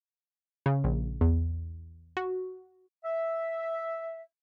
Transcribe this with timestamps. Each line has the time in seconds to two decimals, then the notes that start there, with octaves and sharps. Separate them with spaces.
0.66 C#3
0.84 A#1
1.21 E2
2.17 F#4
3.05 E5